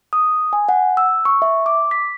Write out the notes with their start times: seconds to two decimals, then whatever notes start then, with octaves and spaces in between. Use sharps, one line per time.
0.13 D#6
0.53 G#5
0.69 F#5
0.97 E6
1.25 C#6
1.42 E5
1.66 D6
1.91 B6